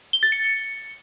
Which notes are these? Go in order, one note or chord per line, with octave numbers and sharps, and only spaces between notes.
G7
A6
C#7